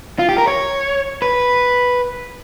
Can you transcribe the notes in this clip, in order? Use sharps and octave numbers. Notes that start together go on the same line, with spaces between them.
F4
G4
A#4
C#5
B4